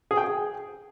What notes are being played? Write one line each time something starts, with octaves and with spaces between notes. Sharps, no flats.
G#4
G5
G#4